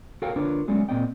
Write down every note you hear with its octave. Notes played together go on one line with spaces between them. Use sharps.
F#4 A4 A#4 C#5 F5 G5
D3 D4 F4 A#4 B4 C#5
F#3 G#3 A3 B3 C#4 D5
A#2 G3 C4 D5 D#5 G5